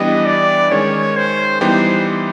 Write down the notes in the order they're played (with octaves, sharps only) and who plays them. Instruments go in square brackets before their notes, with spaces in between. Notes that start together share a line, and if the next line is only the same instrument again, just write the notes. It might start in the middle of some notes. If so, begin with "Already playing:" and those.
Already playing: [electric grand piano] E3 G3 B3 D4 G4 [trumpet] D#5
[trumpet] D5
[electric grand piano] D#3 G#3 C#4 [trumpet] C#5
[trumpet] C5
[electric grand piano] E3 G3 B3 D#4 G4 [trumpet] C5